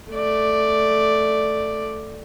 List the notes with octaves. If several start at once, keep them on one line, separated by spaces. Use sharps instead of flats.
A3 D5